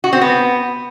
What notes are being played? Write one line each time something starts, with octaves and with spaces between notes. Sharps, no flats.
F#4
C4
B3